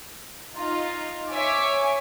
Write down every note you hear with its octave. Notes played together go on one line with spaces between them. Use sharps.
D#4 F4
C#5 E5 G#5 D6